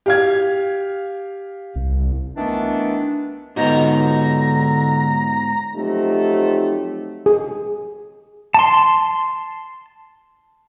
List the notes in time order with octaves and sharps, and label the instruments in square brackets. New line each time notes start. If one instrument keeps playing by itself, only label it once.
[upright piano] G4 F5 G#6
[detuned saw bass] C2
[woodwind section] D#3 E3 A3 B3 D4
[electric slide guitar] G#2 B3 [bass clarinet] D3 [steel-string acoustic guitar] D#4 F#4 [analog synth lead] A#5
[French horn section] F3 F#3 A3 C4 D#4 G4
[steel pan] G#4
[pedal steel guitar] A5 C6